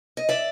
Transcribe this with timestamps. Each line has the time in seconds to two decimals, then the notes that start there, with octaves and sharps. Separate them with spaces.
0.17 D#5
0.29 D5 E5